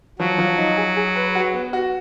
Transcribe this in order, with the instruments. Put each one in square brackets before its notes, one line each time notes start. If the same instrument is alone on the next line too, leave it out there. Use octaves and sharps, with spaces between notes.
[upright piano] F3 [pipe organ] F#3
[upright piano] F3
D#4
G#4
G#4
B4
F#4
B3
F#4